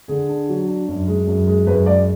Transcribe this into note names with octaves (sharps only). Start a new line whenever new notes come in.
D3 G#4
D4
F#3
D4
F#2
G#3
F#2
G#3
F#2 B4
G#3 D5